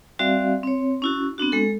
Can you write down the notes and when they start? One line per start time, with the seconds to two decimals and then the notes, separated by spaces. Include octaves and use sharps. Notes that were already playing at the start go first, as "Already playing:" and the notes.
0.19 G3 C4 F#4 D5 E5 F5
0.63 C4 C#5
1.02 C#4 E4 F#4
1.38 B3 C4 D4 F#4
1.52 G#3 A4